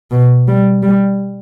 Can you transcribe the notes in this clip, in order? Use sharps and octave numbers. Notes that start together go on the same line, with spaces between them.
B2
G3
G3